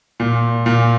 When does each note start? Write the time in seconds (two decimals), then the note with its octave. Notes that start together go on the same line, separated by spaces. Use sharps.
0.20 A#2
0.66 A#2